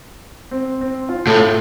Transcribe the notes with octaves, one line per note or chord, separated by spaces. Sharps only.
C4
C4
F4
A2
F4